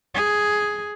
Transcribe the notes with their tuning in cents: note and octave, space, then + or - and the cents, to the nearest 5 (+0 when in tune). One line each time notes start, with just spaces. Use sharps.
G#4 +5